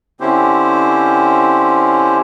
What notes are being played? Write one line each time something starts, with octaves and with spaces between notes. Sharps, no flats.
D3 C4 C#4 E4 G4 C5